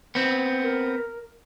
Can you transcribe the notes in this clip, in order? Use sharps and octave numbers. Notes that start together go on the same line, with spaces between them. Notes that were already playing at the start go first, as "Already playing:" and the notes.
B3 C4
A#4